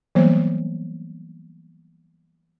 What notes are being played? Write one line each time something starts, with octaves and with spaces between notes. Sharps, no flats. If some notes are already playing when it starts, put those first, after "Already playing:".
E3 F#3 G3 A#3 B3 C5